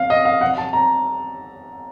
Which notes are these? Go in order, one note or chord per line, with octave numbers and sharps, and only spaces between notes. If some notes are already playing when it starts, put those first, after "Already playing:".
Already playing: F5
D#5
F5
F#5
A5
A#5